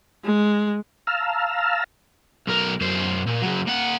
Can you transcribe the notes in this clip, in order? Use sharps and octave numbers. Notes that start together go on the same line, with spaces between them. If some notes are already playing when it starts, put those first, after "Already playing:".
G#3
F5 A5 A#5 E6 F6
B1 A#4
F#2 C5
A#2
C#3 F#3
A#3 F#5